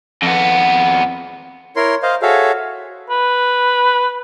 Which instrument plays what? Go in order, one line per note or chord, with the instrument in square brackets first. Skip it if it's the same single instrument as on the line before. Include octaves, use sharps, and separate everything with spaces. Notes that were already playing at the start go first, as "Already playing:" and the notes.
[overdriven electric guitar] F2 B3
[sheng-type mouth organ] E4 A#4 C#5 C6
C5 D#5 F5
F#4 G#4 A4 C#5 E5 F5
[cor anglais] B4